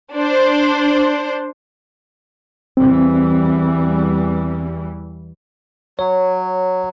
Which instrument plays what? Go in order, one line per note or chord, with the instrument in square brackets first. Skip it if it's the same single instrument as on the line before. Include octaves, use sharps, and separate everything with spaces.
[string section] D4 C5
[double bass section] E2 E3 G3 [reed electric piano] C4
[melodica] F#3 [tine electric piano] C#5